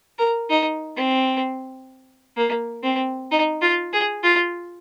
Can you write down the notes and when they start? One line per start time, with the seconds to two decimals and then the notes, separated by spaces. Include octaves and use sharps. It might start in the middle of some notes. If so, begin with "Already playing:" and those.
0.18 A#4
0.49 D#4
0.96 C4
2.37 A#3
2.84 C4
3.31 D#4
3.61 F4
3.93 G#4
4.23 F4